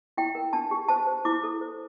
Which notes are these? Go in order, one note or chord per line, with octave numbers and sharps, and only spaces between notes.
E4 G5
A#4
D4 A5
G4
C5 A5
C5
E4 D6
A4
C5